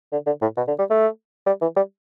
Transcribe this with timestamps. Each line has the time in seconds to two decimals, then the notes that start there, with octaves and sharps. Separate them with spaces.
0.12 D3
0.26 D3
0.42 A2
0.57 B2
0.68 D3
0.79 G3
0.90 A3
1.47 G3
1.62 E3
1.76 G3